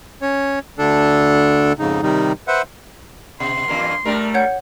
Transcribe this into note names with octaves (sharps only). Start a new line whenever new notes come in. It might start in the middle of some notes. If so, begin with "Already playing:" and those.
C#4 C#5
D2 D3 D4 A4
F2 G#2 C#3 D#4
C3 D#3 G3 D#4
B4 C5 E5 F#5
B2 C6
E2 G2 A#3
G3 A3 D4 A#4
C#5 F#5 G6